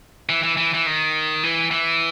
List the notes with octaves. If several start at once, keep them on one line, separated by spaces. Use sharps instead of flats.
E3
E3
E3
E3
D#3
E3
E3